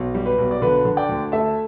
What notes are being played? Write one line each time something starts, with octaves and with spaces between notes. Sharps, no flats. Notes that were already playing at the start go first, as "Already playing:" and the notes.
Already playing: B1
G3
B4
B1
D5
D3 B4
D3
D5 G5
D2
A3 E5 A5